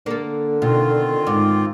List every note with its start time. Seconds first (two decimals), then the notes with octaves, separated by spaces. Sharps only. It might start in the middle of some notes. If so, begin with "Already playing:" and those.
0.06 D3 A#3 A4
0.62 B2 D#3 C4 F4
1.27 G#2 D6